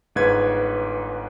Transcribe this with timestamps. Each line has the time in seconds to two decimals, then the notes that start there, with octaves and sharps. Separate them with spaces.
0.15 G1 G#2 B4 G#6